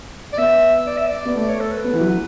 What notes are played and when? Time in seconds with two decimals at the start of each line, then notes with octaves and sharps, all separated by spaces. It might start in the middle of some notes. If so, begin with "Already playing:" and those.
0.33 D5
0.38 B3 E5
0.87 D5
0.97 E5
1.07 D5
1.25 B3
1.35 A3 D5
1.48 C#5
1.60 A4
1.71 B4
1.84 B3
1.93 E3
2.01 F#3